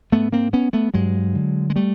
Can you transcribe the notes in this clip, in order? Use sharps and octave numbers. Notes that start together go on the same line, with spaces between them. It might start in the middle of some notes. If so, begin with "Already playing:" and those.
G#2 A3 B3
A#3 C4
B3 C#4
A3 B3
G2 F#3 G#3
D3
G#3
G3 A3